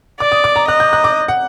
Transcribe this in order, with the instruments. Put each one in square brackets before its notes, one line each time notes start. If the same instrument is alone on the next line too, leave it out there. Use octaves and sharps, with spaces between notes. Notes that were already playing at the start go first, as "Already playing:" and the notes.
[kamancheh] D5 [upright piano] D6
[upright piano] D#6
D6
A#5
[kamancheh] D#5 [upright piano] F#6
[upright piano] G6
F#6
D6
F#5